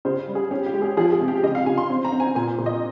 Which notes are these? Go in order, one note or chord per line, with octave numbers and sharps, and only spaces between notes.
C#3 C5
G3
G#4
C#4 G4
G4
G#3
G#4
F3 G#4
G#4
C3
G4
C#3 D#5
F5
C#3 G#5
C6
C4
A#5
C4
G#5
A#2 G#5
A#2
D#5